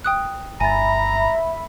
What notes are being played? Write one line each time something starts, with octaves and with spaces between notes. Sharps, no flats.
G5 D#6 F#6
G1 E5 G#5 A#5 B5 A6